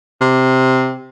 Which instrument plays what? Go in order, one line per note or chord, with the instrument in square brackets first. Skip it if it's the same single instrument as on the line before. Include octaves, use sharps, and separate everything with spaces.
[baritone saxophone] C3